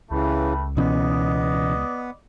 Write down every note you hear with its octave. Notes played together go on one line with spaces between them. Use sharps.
C#2 C#3 E3 G3 A3 B4
B2 E3 B3 C#4 D5 D#5